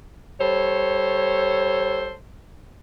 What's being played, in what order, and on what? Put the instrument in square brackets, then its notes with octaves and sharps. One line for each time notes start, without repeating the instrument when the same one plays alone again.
[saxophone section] G3 A4 C5 C#5